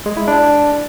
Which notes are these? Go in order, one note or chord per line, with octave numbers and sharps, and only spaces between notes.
G#3
E4
D4